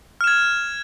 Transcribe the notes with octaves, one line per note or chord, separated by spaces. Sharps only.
F6 G#6 E7